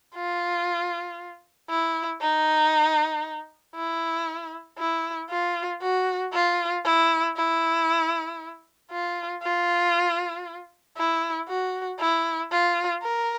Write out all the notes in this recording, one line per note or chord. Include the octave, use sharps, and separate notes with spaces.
F4
E4
D#4
E4
E4
F4
F#4
F4
E4
E4
F4
F4
E4
F#4
E4
F4
A#4